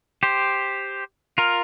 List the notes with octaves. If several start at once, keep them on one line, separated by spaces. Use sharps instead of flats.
G4 C5
F4 A#4